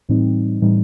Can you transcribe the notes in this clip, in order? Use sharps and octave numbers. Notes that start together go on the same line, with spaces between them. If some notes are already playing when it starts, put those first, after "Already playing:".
A2 E3 G3 C4 D#4
A2 E3 G3 C4 D#4